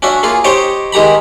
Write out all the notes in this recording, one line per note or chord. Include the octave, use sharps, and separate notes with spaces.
C#4 D4 F#4 E5
A#3 F4 G#4
D#4 G4 C5 C#5 D#5 G5
D#3 G#3 G4 A#5 B5